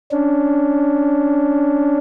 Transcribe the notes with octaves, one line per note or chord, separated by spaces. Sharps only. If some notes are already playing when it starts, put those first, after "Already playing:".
C#4 D4